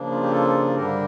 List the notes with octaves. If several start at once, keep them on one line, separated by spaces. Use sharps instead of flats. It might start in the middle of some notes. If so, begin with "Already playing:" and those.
Already playing: C#3 F3 A#3 D4
F4
G4
F4 A4
G2 D3 G3 D4 G4 A#4